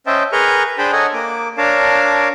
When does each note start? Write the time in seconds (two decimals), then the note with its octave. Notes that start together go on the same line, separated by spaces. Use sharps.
0.07 C#4 C5 D#5 E5 G5 A5
0.32 G#4 A#4 B4 C#6 F6 G6
0.78 D4 G#4 C5 G5 A5 B5
0.92 A4 C#5 D#5 F#5 G#5 A#5
1.14 A#3 D6
1.57 D4 A#4 C#5 F5 A5 D6